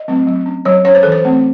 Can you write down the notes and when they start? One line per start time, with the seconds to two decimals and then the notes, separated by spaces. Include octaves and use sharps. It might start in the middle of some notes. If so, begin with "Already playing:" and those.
Already playing: D#5
0.08 F#3 A3 C4
0.27 F#3
0.46 C#4
0.65 F#3 C#5
0.85 C#4 C#5
0.95 C5
1.03 E3 A4
1.12 C5
1.25 A3 C4